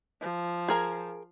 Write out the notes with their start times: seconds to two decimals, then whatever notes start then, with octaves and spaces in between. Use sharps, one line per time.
0.21 F3
0.68 G#4 A#4 G#5